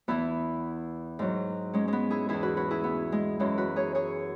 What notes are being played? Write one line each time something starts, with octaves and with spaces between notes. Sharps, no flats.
E2 E3 B3 E4
G#2 F#3
G#3 C#4
G#3 B3
E4 G#4
E2 E3 E4 G#4
F#4 B4
F#4 B4
E4 G#4
B3
G#3
F#2 E3 G#3 C#4
F#4 B4
G#4 C#5
G#4 C#5